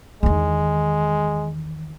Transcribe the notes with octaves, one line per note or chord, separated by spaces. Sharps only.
E2 D#3 G#3